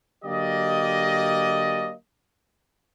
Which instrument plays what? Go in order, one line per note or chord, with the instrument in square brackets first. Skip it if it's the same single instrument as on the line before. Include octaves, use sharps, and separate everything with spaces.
[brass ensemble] D3 F#3 A#3 G4 D5 D#5